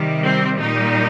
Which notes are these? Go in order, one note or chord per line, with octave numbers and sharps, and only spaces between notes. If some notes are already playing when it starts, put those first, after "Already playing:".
Already playing: C3 D#3 G3
C4
A#2 G3 D#4